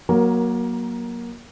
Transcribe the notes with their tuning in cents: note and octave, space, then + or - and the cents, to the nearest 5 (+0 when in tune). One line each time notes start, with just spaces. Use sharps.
F#3 +0 A#3 +25 A#4 +5